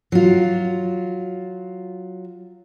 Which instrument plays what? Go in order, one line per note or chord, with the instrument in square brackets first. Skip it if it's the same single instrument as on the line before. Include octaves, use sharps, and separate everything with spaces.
[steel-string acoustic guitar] F#3 F4